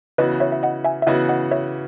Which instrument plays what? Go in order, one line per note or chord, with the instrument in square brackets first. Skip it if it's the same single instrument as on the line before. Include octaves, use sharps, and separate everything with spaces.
[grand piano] C#3 E3 B3 F#4 [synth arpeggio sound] B4 D#5
[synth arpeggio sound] C#5 E5
E5
D#5 F#5
E5 G#5
E5
[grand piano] C#3 E3 B3 F#4 [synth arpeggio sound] D#5 F#5
[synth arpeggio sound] D#5 F#5
C#5 E5